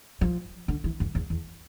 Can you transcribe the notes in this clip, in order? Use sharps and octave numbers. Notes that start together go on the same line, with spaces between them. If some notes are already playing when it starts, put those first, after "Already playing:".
F3
D3
E3
F2
E2
E2